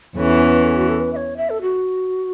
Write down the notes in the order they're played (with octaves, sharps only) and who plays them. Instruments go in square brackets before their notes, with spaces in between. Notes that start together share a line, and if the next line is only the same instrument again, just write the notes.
[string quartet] E2 E3 C#4 [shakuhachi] A4
[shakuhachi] C#5
B4
A4
F#4
A4
B4
E5
C#5
E5
A4
F#4